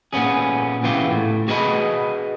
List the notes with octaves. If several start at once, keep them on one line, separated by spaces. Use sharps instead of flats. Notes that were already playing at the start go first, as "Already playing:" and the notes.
A#2 B3 C#4 G#4
A#2 C#3 E3 B3 F4 G4
A2
F#4 G#4 B4 D#5 A#5 B5